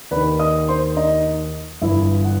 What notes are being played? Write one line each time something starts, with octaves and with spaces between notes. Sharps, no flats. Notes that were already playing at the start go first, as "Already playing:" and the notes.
D#2 D#3 B4 B5
D#5 D#6
C5 C6
D#4 D#5
G1 G2 E3 E4 E5
F#5